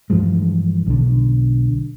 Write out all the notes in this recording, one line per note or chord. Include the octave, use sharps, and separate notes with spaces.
G2 E3 F3 G#3
B1 D3